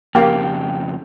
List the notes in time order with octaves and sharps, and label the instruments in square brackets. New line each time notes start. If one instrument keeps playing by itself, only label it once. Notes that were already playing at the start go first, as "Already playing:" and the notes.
[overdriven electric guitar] F2 C#3 [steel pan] A#3 G4 F5 [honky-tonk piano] G5